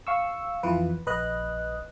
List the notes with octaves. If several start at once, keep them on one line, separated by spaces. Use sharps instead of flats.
F5 C#6 E6
F2 E3 F4 B4
A#1 B4 D#5 F#6